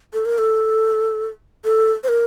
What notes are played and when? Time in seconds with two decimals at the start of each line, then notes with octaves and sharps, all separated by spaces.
0.14 A4
0.25 A#4
0.38 A4
1.65 A4
2.04 C5
2.08 A#4